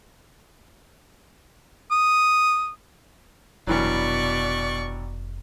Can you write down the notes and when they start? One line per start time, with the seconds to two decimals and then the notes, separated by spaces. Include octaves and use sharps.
1.91 D#6
3.67 F1 G2 B2 E3 F#3 D5 C#6